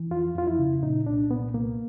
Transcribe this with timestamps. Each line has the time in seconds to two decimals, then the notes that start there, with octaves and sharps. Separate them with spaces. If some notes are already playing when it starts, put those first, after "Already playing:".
Already playing: E3
0.11 F2 F4
0.34 F2 F4
0.47 E4
0.59 C#3
0.82 A#2 D#4
1.06 C2 D4
1.30 A#2 B3
1.54 C2 A#3